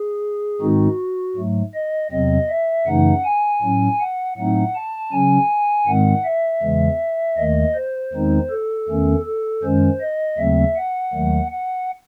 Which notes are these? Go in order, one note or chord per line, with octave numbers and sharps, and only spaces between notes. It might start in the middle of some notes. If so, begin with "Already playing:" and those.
Already playing: G#4
G#2 D#3 G#3 C4 D#4 F#4
G#2 F#3 A3
D#5
E2 C3 F#3 C4 D#5
E5
F#2 C#3 E3 A3 D#4 F#5
G#5
A2 F#3 C#4
F#5
A2 F#3 A3 C4 D#4 F#5
A5
C#3 F#3 C#4 G#5
G#2 D#3 G#3 C4 F#5
E5
E2 C#3 E3 G#3
D#2 D#3 A3 D#5
C5
E2 D#3 G#3 C4 D#4
A4
E2 D#3 A3 C#4
A4
F#2 D#3 G#3 C#4 C5
D#5
D#2 C#3 F#3 A3 C4 E5
F#5
D#2 D#3 F#3 A3
F#5